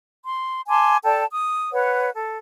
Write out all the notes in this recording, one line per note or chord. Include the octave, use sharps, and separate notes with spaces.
C6
G#5 A5 C6 D6
A4 D5 G5 A5
D#6
B4 C#5 F#5
A4